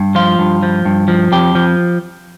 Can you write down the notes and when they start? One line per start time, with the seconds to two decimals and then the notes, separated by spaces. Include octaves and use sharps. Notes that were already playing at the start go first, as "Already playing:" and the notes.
Already playing: G2
0.15 F3 F4
0.39 G2
0.63 F3
0.85 G2
1.08 F3
1.32 F2 G4
1.55 F3